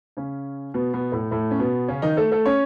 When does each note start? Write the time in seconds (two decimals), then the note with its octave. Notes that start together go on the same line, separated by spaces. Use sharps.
0.17 C#3 C#4
0.74 B2 B3
0.94 B2 B3
1.12 A2 A3
1.31 A2 A3
1.51 C#4
1.59 B2 B3
1.88 C#3 C#4
2.02 D#3 D#4
2.17 A3 A4
2.32 A3 A4
2.46 C#4 C#5